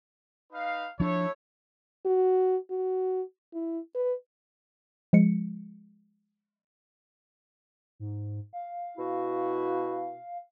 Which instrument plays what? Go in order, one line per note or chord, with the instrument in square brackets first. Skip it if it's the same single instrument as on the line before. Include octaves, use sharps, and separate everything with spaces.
[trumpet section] D#4 B4 F5
[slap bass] F3 D4 [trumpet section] A3 E4 C#5
[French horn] F#4
F#4
E4
B4
[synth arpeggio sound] F3 G#3 C#7
[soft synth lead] G#2
F5
[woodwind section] B2 E4 F#4